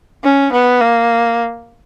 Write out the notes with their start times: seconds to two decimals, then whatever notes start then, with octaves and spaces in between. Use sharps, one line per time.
0.24 C#4
0.52 B3
0.81 A#3